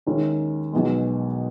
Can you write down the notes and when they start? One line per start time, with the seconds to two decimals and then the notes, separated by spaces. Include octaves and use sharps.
0.06 D#2 D#3 G#3 C#4 E4
0.73 B1 B2 G#3